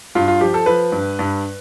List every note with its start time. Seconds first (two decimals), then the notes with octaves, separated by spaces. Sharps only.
0.15 G2 F4
0.28 F4
0.41 F3 G4
0.54 A4
0.66 F3 B4
0.92 G2
1.19 G2